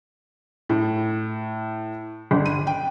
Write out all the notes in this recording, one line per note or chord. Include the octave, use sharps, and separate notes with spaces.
A2
G1
D#7
G5